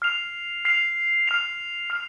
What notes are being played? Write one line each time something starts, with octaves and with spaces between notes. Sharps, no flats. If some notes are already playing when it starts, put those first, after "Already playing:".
F6 C7 F7
F6 C7 F7
F6 C7 F7
F6 C7 F7